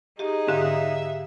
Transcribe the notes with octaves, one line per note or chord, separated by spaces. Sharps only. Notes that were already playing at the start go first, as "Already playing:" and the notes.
D#4 G4 G#4 D#5
G#2 D3 G4 E5 F5